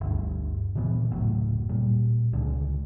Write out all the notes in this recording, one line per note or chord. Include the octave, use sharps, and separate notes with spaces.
G1 D2 G2
A#2 D3 E3 B3
F#1 D2 A2 F#3
A#2 G3
C#2 D3 G3 G#3